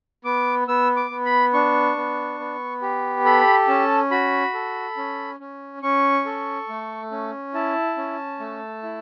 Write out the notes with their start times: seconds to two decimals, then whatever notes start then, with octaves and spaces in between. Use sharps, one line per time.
0.25 B3 D6
0.68 B3 E6
0.96 D6
1.10 B3
1.25 B5
1.54 D4 C#6
1.96 B3
2.40 B3
2.82 G4
3.25 A4 B5
3.68 C#4 A5
4.11 F#4 B5
4.54 A4
4.97 C#4
5.40 C#4
5.82 C#4 C#6
6.26 A4
6.69 A3
7.11 C#4
7.54 E4 A5
7.97 C#4
8.40 A3
8.83 E4